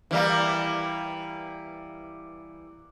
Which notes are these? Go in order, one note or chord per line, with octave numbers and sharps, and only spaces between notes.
E3 G3 A#3